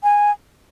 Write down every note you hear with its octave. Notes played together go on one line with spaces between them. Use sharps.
G#5